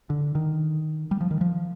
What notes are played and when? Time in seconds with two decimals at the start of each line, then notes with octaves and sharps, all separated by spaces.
0.10 D3
0.35 D#3
1.11 G3
1.21 F3
1.31 D#3
1.41 F3